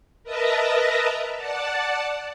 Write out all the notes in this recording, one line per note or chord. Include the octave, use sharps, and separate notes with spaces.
A#4 B4 D#5 E5 A5 A#5
D5 F#5 A5